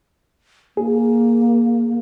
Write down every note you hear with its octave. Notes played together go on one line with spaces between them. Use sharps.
A#3 G#4